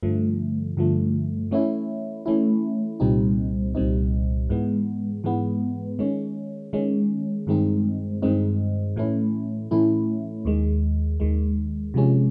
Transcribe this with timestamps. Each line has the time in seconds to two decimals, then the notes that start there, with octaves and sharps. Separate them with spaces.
0.03 G2 D3 F3 A3
0.77 G2 D3 F3 A3
1.51 E3 A3 C#4 E4
2.26 E3 A3 C#4 E4
3.00 C2 A#2 G3 C4 D#4
3.75 C2 A#2 G3 C4 D#4
4.49 G#2 E3 G#3 B3
5.24 G#2 E3 G#3 B3
5.99 D#3 G#3 C#4
6.73 D#3 G#3 C#4
7.47 G2 D#3 G#3 C4 D#4
8.22 G2 D#3 G#3 C4 D#4
8.96 A2 E3 A3 C#4 E4
9.71 A2 E3 A3 C#4 E4
10.45 D#2 D#3 G#3
11.20 D#2 D#3 G#3
11.94 C3 F3 G#3 C#4